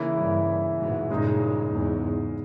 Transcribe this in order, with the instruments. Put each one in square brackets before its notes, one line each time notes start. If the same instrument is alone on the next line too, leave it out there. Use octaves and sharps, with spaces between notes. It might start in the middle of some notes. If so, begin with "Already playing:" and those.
Already playing: [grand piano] C#3 E3 A#3 E4
[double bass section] G2
G#2 B2
[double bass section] G2 A#2 [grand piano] C#3 G#3 D#4
[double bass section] E2 G#2